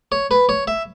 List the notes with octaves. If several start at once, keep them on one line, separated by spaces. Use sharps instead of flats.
C#5
B4
C#5
E5